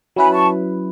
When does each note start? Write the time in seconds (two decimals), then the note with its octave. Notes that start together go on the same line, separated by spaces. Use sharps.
0.16 F#3 C#4 E4 B4 G#5 B5
0.31 A5 C#6